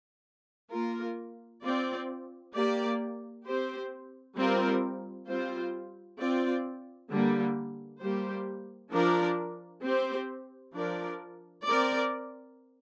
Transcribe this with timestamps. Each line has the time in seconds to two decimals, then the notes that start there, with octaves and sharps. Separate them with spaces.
0.71 A#3 F4 A#4
1.63 C4 F4 D5
2.54 A#3 G4 D5
3.45 C4 G4 C5
4.36 G3 C4 F4 A#4
5.27 G3 C4 F4 C5
6.18 C4 F4 D5
7.09 D3 G3 A#3
8.00 G3 A#3 G4 C5
8.91 F3 D4 A#4 D5
9.83 C4 G4 C5
10.74 F3 D4 A#4 D5
11.65 C4 A#4 D5